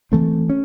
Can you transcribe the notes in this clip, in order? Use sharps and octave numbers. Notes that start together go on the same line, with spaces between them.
E3 A3 C4
C#4